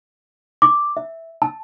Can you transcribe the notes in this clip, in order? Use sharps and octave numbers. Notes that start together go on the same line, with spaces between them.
D6
E5
A5